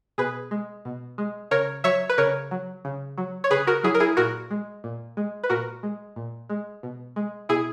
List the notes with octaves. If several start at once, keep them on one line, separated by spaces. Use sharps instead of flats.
B2 G#4 B4
G#3
B2
G#3
C#3 A#4 C#5
F#3 C#5 E5
B4
C#3 A#4 C#5
F#3
C#3
F#3
C#5
C#3 G#4 B4
F#4 A#4
F#3 E4 G#4
A#4
E4 G#4
A#2 F#4 A#4
G#3
A#2
G#3
B4
A#2 F#4 A#4
G#3
A#2
G#3
B2
G#3
B2 E4 G#4